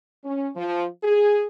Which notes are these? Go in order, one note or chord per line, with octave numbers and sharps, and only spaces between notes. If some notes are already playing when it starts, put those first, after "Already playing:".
C#4
F3
G#4